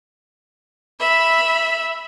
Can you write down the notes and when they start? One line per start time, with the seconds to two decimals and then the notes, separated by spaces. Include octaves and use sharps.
1.00 E5 B5